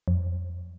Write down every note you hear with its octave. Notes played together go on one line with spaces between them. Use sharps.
F2